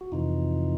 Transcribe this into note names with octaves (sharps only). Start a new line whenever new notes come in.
F#4
F2 C3 E3 D#4 F4